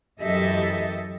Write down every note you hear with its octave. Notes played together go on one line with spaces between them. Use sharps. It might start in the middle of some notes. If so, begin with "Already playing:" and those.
F#2 E3 G4 A4 D#5 E5